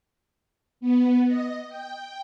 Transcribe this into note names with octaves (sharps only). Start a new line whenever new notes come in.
B3
D#5
G5